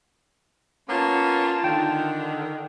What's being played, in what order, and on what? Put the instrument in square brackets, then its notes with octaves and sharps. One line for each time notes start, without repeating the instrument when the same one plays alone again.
[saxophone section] A#3 B3 C#4 [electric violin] F4 A5
[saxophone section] D3 D#3 [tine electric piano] G5